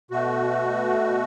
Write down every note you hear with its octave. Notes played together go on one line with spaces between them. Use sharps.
B2 A3 F#4